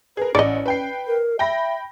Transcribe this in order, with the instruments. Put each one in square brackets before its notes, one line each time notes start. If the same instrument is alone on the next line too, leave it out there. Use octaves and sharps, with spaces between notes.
[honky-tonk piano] G#4 A#4 [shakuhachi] B4
[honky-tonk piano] A1 C#7 [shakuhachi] C#4 [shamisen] D5 D#5
[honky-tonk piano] B4 G5 C7
[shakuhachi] A#4
[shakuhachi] E5 [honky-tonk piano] G5 B5 A#6